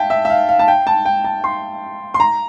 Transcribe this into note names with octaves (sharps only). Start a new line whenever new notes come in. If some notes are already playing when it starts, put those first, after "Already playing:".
Already playing: E5 F5 G5 A5
E5
E5
F5
F5
A5
G5
A5
G5
A5
C6
C6
A#5